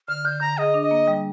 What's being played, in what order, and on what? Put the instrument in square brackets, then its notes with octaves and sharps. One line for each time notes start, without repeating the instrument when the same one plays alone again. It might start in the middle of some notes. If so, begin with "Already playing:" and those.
[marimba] D3 [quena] F6
[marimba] D3 [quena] G6
[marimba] D3 [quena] A#5
[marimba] G#4 [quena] D#5
[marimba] D4
[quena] D#5
[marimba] A#3
G3